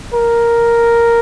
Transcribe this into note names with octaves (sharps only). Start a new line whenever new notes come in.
A#4